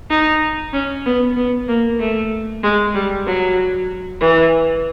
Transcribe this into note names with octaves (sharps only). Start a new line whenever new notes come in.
D#4
C#4
B3
B3
A#3
A3
G#3
G3
F#3
E3